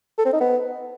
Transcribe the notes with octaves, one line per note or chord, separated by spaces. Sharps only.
A4
C4
D#4
B3